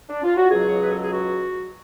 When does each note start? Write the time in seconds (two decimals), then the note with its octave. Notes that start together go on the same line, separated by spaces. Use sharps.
0.09 D4
0.23 F4
0.36 F#4
0.50 C#2 B2 F#3 G#4
0.67 C#5
0.79 B4
0.90 A4
1.00 G#4
1.11 F#4